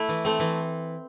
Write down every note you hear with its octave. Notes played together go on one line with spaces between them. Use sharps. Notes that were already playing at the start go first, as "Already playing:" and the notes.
Already playing: A3 E4
E3
A3 C4
E3